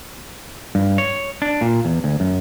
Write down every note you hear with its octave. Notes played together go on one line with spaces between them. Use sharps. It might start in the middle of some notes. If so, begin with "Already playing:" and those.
G2
C#5
D4
A#2
E2
D2
F#2